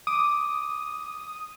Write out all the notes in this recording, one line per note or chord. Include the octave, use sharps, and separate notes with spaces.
D6 D#6